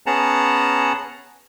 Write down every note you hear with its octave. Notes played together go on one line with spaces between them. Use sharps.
B3 C#4 G#4 F#5 A5 A#5